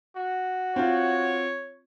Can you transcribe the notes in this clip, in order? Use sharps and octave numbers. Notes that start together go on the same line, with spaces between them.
F#4
C4 F4 C#5